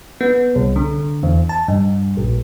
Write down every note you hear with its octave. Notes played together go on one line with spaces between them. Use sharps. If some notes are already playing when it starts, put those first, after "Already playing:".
B3
C2
D3
E2
A5
G2
A#1